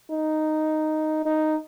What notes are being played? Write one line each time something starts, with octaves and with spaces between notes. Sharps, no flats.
D#4
D#4